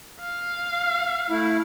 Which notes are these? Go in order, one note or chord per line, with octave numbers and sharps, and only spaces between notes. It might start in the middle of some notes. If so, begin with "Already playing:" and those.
F5
A3 E4